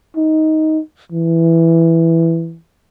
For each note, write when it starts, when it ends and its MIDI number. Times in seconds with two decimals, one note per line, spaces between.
0.16 0.79 63
1.12 2.58 52